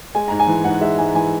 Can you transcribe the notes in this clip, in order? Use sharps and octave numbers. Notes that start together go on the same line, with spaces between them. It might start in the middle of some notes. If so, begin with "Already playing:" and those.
G#3 G#5
G#2 A#5
G#5
E3
G#2 F#5
G#3 E5
G#2 G#5
E3 G#5